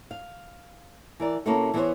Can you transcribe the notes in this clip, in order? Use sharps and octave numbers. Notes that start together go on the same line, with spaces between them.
F5
E3 A#4 D5
C3 A#3 C#4 E4 F#4 A4
E3 B3 G#4 A#4 C5 C#5